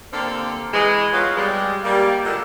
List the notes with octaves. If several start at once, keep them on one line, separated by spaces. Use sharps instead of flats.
D3 A#3 C4 G4 A4 F5
E3 G#3
F#3 B3 F4
G3 G#3
G3 A#3
A#2 D3 G#3